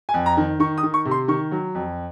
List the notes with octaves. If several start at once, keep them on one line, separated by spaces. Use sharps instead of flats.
G#5
F2
A#5
D#3
D#3 C#6
D#6
D#3
C#6
C3
C6
D#3 C#6
F#3
F2